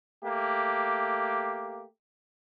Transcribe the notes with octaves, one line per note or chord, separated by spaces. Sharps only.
A3 A#3 G4